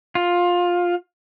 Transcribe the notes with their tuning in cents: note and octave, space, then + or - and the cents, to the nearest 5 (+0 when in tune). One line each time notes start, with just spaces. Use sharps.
F4 +15